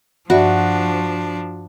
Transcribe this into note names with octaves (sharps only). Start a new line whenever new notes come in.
G2 F3 D4 F#4 D5 E5